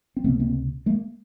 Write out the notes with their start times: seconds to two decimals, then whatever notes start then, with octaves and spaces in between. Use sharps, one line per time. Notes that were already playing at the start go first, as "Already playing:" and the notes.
0.17 C4
0.24 C#2 C3 A3 B3
0.40 A#3 C4
0.86 G#3 A#3